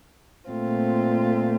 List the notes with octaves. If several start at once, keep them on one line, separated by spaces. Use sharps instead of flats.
A#2 A3 C4 F4